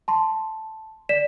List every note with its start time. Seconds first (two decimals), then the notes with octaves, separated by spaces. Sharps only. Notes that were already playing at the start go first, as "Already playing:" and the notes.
0.08 A5 C6
1.09 D5 B6 E7